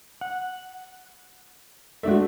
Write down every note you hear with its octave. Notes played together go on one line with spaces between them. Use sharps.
F#5
G#3 A3 D4 F#4 E5